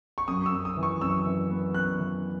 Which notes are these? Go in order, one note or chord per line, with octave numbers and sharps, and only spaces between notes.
C#6
F#2 D#6
E6
F#2
D#6
E3
C#6
F#2 E6
E3
B3
F#2 F#6
E3